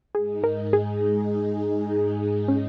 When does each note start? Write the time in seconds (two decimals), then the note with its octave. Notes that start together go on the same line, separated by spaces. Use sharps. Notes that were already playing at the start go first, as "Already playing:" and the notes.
0.15 G#2 G#3 D#4 G#4
0.44 A#4
0.73 G#4
2.48 C#4